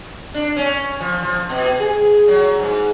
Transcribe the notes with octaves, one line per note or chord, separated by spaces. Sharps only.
D4
C#4
F3
F3
B2
G#4
F#3
G#2